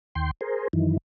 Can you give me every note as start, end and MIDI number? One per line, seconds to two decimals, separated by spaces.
0.15 0.31 39
0.15 0.31 79
0.15 0.31 84
0.41 0.68 68
0.41 0.68 70
0.41 0.68 72
0.73 0.97 42
0.73 0.97 51
0.73 0.97 52